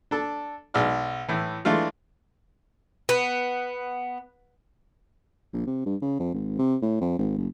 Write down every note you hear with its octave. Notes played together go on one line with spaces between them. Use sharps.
D4 A4
B1 G#3 D5 F6
A2 E3
E3 G#3 A3 D4 F4
B3
A#1
C3
G2
C#3
F2
G#1
C3
A2
F2
G#1
F#1